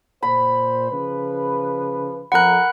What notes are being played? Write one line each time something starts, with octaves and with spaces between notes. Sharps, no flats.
A#2 C5 B5
C#3 F3 B4
F2 A#4 F#5 A#5 B5 F#6